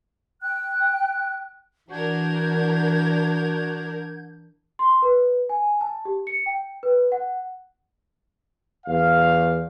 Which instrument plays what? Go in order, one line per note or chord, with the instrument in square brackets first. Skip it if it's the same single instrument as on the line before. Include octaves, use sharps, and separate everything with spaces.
[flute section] G5 F#6
[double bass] E3 [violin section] D4 A#4 [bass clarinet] F#4 [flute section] F#5 G6 G#6
[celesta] C6
B4
G#5
A5
G4
C#7
G5
B4
F#5
[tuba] E2 [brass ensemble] F5